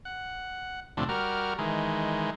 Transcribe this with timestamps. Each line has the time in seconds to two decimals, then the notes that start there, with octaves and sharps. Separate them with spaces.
0.05 F#5
0.97 D2 A2 C3 F3 D4
1.09 G3 F#4 A#4 F6
1.58 D#3 E3 G#3